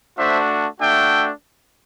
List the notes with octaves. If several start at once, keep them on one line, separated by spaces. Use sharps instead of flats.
A3 D4 F#4 C5 E5
A3 D4 F#4 E5 G5